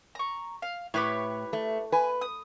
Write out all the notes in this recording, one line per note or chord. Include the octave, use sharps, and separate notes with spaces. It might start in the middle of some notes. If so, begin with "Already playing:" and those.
A#5 C#6
F5
A2 G4 B4 C#5
A3
B4 G#5
D#6